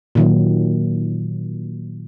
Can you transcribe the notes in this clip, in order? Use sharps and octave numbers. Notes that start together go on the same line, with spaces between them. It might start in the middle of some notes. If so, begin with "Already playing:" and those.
A#2 D#3 F#3